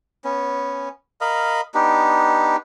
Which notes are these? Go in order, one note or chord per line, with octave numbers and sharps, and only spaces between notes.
B3 C#4
A#4 D#5 F5 B5
B3 D4 D#4 G4